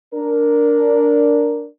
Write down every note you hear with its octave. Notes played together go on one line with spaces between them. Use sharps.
D4 A#4